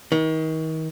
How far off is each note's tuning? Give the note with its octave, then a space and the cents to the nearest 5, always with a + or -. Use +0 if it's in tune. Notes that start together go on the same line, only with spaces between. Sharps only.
D#3 +35